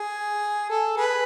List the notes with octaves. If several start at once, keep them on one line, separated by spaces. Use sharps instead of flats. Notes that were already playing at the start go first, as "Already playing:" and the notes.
Already playing: G#4
A4
G#4 B4